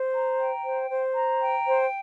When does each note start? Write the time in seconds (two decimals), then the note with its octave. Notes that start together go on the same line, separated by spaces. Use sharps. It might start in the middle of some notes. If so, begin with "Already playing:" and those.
Already playing: C5
0.13 A#5
0.39 G5
0.64 C5
0.89 C5
1.14 A#5
1.40 G5
1.65 C5